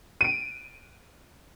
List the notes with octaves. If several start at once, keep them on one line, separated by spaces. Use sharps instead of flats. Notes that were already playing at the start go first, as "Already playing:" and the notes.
D7 D#7